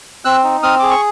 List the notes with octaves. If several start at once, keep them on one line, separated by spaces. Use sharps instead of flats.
C4 E6 F#6
D#4
C4 D#6 F6
G#4 D6
C#6